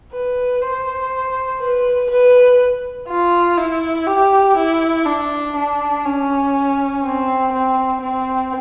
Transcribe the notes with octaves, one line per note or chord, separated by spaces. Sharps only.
B4
C5
B4
B4
F4
E4
G4
E4
D4
D4
C#4
C4
C4
C4